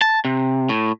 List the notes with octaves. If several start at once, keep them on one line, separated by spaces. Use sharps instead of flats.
A5
C3
A2